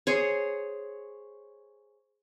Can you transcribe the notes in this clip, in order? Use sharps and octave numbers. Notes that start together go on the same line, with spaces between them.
G#4 C5 C#5